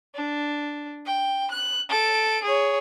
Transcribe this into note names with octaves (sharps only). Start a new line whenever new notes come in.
D4
G5
F#6
A4 D7
G#4 C#5